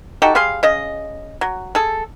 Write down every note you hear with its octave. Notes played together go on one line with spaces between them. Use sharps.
D#4 F#4 G4 A4
G3 G#4 F5 C6
C#3 D#5
F#3
G#4 A4